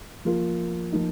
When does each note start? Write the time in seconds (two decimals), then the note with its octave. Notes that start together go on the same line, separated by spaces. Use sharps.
0.25 F3 A#3 F4
0.92 F3 A#3 D#4